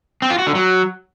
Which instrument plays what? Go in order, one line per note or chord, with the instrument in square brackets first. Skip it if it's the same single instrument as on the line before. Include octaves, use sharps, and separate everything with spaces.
[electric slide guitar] C4
F4
F#4
D3
F#3